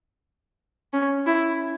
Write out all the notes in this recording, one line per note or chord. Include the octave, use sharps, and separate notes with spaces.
C#4
E4